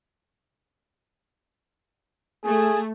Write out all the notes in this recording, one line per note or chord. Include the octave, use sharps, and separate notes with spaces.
A3 G#4